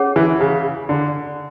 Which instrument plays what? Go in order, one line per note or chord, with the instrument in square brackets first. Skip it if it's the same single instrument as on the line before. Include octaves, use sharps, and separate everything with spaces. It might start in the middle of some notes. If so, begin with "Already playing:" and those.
Already playing: [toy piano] C#4 G#4 C#5 F#5
[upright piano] E3
C#3
D3